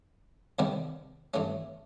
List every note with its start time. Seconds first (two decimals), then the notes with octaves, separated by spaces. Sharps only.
0.59 E2 C3 D#3 G3 B3
1.34 G2 E3 A3 C#4